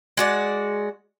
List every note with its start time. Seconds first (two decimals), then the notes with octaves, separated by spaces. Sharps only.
0.17 G#3 F#4 D5